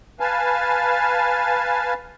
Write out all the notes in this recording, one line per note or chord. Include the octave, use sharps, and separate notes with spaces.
B4 F5 G#5 A5